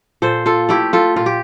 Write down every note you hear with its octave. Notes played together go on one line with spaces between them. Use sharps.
A#2 A4 C5
F4 A4
A3 E4 G4
F4 A4
A#2 F4
G4